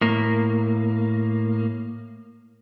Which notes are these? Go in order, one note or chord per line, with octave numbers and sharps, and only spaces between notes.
A2 A#3